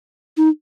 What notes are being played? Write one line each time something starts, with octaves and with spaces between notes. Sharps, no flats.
D#4